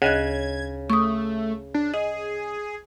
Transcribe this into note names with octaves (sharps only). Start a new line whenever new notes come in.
D2 C#3 D#5 F#6 G#6
A3 C#6 D#6
D4
G#4 D#5